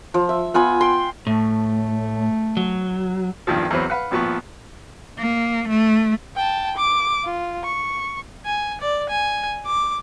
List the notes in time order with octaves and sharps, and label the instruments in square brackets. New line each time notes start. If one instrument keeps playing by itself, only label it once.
[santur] F3
E5
B3 F4 G#5 B5
G5 C6
[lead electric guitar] A2 [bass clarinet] A3
[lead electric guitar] F#3
[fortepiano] E2 G2 D#3 F3
E2 F#3 C4 B4
B4 F5 F#5
G#1 A#2 F3 B3 C#6
[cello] A#3
A3
[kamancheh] G5 A5
D6
F4
C#6
[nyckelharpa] G#5
D5
G#5
D6